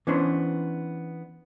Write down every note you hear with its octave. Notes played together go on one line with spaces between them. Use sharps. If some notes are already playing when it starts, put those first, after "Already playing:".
E3 B3 C#4 D4 C5